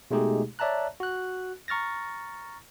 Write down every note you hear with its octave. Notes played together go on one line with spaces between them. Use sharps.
B2 G#3 A3 D#4 G4 G#4
C#5 D5 E5 A5 A#5 F#6
F#4 F#6
A#5 C#6 F6 A6 A#6